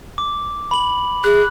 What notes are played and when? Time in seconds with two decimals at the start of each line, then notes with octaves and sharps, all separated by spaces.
0.18 D6
0.71 B5 F#7
1.24 G#4 F#6